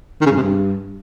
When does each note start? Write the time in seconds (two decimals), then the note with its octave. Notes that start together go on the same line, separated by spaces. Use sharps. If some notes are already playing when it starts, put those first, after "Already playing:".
0.21 D#3
0.26 C#3
0.31 G2
0.37 C3
0.42 G2